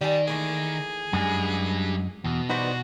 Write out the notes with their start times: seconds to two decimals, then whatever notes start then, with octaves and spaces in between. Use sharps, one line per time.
0.01 D#3 G3 D5 G#5
0.28 E3 A3 A#3 G#4
1.13 F#2 G3 G#3 D4 G#5
2.24 E2 B2
2.49 E3 G3 D#4 F#4 B4 C5